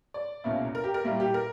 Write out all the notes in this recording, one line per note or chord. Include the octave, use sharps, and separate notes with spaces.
D5
C#2 B2 A#3 C#4 E4
A#4
G4
A#4
A#2 G3 A#3 E4
G4
A#4